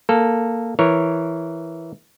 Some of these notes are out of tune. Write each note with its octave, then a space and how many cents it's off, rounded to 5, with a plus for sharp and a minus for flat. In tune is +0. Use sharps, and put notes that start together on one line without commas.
A#3 -5 A4 +0
E3 +0 A#4 +5 C#5 +0